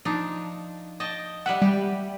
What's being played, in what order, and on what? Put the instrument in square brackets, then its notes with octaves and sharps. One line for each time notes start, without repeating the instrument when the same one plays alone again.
[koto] F3 D4 D#4
D#5 G5 A5
[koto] G3 B4 E5 [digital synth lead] F#5
[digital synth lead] G3 [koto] G4